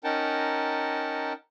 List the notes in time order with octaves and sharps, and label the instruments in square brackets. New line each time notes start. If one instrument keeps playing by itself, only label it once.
[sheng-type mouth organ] C#4 D#4 A#4 F#5 G5 A5